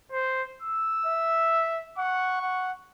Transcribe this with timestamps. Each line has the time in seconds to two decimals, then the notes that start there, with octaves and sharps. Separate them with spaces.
0.12 C5
0.62 E6
1.06 E5
1.98 F#5 C#6
2.42 F#5